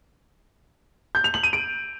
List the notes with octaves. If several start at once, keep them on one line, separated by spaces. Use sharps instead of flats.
G6
F7
F#7
D#7
D7